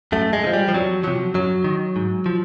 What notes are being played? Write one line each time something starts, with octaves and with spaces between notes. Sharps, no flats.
F#2 A3
G#3
D3
F3
G3
F3
F2 F#3
C3 F3 F#3
F#2 F#3
D#3
G#2
F3